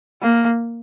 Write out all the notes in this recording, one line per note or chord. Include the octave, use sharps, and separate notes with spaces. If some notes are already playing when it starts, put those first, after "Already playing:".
A#3